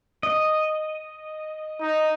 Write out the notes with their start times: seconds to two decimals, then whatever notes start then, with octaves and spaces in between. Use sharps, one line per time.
0.23 D#5
1.81 D#4